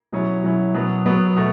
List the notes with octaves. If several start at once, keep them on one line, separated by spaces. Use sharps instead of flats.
B2 F#3 C#4 E4
B2 F#3 C#4 E4
B2 F#3 B3
B2 F#3 B3
B2 A3